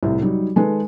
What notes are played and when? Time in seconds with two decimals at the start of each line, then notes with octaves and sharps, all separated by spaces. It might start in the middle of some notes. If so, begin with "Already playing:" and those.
0.03 C2 A2 C3
0.22 F#3 G3 D#4
0.56 D#3 G#3 A4 B4